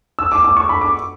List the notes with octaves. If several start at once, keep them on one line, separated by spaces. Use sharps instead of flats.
E6
D6
D6
C#6
B5
D6